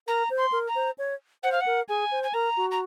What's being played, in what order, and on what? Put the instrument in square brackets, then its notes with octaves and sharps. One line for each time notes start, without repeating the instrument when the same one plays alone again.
[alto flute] A#4 [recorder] A#5
[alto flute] C5
[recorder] C6
[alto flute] A#4
[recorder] A#5
[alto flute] C5
C#5
[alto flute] C5 [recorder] F#5
[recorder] F5
F#5
[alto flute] A#4
[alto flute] G#4 [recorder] G#5
[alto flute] C5
[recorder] G#5
[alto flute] A#4 [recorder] A#5
[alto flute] F#4
[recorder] A#5